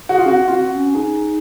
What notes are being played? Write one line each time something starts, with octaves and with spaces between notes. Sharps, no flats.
F#4 G#4
F4
C#4
C4 F#4
F4
C4 F#4
C#4
D#4 G#4